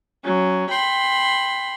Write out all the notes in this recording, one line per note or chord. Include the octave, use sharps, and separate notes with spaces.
F#3 C#4
G5 B5 C6